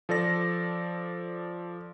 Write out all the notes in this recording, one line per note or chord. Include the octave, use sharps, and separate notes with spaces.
F3 A4 D5 A#6